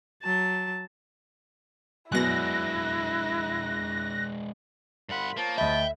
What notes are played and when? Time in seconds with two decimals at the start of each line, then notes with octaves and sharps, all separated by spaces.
0.23 F#3 A5
2.12 F#2 B2 G#3 B3 D4 E4 F#6 A#6
5.09 C2 G2 F4 F#5 B5
5.37 F3 A#3 C#5 A5
5.58 D2 D#5 E5 G5 B5